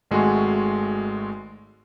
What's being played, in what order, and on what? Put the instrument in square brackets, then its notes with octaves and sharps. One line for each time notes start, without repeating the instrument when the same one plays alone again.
[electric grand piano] G#1 G#3 A3 F#4 G#5 C6